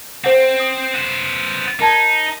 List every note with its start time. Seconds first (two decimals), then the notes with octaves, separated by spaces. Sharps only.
0.24 C4 C5 F#5
0.60 D#6
0.94 B3 C5
1.80 D#4 A#4 A5 G#6